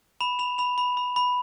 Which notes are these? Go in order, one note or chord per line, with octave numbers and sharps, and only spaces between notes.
B5 E7
B5 F7
B5 F7
B5
B5
B5